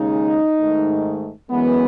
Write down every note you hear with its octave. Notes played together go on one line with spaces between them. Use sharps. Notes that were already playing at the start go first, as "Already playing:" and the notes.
Already playing: D#2 C#3 G#3 D#4
G#2 D#3 A3
F#2 E3 G#3 B3